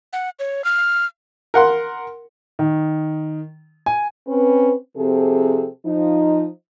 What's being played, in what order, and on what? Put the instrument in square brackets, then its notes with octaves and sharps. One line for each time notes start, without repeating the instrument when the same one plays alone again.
[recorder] F#5
C#5
F6
[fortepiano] A#4 F#5 C6
[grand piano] D#3
G#5
[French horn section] C4 C#4 B4
C3 F3 C4 G#4 A4
F3 D#4